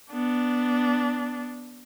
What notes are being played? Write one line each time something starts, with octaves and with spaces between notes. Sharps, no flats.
B3 D4